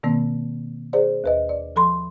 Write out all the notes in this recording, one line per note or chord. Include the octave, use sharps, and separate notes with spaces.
B2 D#3 A#3 C4
G#4 C5 D5
D#2 B4 D#5
D5
F3 A4 B5 C6